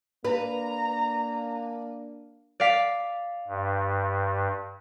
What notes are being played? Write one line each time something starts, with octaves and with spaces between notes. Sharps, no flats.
A#3 D4 B4 A#5
D5 F5 B6
G2